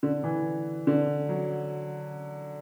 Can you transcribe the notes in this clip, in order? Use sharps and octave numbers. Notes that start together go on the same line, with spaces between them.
D3
E3
D3
F#3